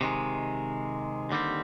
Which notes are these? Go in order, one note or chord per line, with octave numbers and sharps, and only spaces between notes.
C3 D#3 G#3
D#2 D3 G3 C4